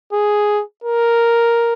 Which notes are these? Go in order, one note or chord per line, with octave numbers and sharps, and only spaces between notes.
G#4
A#4